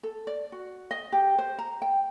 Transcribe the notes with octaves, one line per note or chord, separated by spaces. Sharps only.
A4
D5
F#4
D#5
G4
C5
A#5
G5